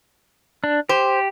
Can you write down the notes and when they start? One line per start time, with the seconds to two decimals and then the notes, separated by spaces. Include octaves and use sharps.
0.64 D4
0.89 G4 C5